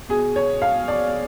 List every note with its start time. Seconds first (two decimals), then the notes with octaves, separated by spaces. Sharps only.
0.09 B2 G#4
0.36 C#5
0.62 F5
0.88 D5